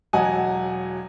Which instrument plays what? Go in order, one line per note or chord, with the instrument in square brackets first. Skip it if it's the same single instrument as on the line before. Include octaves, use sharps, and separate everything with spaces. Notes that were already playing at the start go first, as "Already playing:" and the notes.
[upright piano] E1 F#3 D#5 F#5 G#5 A5